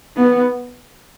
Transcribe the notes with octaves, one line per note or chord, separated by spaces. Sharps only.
B3